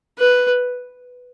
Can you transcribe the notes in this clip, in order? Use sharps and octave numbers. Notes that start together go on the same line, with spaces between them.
B4